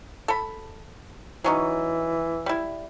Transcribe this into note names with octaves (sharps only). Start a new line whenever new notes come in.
A4 B5
E3 F#3 C#4 D#4
G3 E4